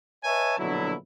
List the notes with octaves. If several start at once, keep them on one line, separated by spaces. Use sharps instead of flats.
B4 C#5 D#5 E5 G#5 A5
A#1 B2 D3 F#3 E4